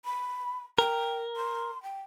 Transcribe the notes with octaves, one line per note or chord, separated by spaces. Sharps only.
B5
A#4 G5
C6
G5